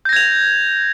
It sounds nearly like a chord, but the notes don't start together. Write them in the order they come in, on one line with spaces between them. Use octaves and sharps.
G6 A#6 G#6 F7